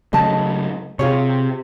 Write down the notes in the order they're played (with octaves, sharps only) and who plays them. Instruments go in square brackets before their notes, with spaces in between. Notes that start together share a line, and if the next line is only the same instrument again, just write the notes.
[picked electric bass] C#3 F#3 A3 [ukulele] D#5 A5
[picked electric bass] C3 [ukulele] F4 G#4 C#5